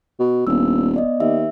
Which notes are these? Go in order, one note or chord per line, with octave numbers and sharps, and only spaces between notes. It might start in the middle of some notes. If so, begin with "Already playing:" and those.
B2
D#1 B3 D4 E6
B3 D5 D#5
D#2 E5